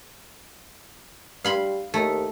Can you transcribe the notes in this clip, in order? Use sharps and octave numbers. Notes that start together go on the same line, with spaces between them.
G3 F5 B5 C6
D#2 A3